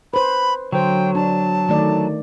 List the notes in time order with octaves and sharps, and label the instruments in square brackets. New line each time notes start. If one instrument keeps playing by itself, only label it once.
[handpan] B4 C5 [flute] B5
[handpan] D3 C5 [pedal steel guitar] F#3 [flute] G5
[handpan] D4 [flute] A5
[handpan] D#3 A3 D5